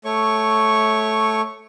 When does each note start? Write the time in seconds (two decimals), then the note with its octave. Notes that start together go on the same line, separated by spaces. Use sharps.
0.05 A3 C#5 C#6